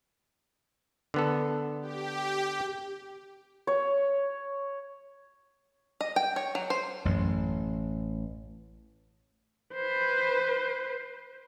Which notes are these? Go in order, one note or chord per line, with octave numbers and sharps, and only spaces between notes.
D3 B3 A4
G4
C#5
D#5
G5
C#5
F#3
C5
A1 F#2
B4 C5